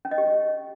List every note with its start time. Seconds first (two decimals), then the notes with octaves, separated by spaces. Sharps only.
0.05 C#4
0.11 D#5
0.18 G4